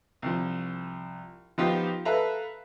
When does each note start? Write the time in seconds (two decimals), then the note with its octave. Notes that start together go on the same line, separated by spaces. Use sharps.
0.22 C2 F3
1.58 F3 B3 D#4 F4 G4
2.05 A4 B4 E5 F5 A#5